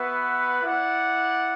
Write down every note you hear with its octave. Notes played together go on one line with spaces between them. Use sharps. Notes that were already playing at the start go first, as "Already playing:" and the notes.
Already playing: B3 F#4 B4 E5
E4 D5 F#5